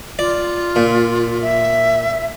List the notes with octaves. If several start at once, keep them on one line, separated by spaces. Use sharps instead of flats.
F4 D5
A#2
E5